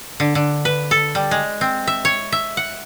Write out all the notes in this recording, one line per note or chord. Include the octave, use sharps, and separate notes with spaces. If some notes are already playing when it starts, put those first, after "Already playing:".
D3
D3
B4
A4
G3
G#3
C4
E5
C#5
E5
F#5